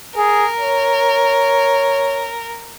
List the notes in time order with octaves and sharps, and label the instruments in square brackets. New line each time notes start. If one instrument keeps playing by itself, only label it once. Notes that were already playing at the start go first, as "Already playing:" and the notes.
[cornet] G#4 [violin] A#4
[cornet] C#5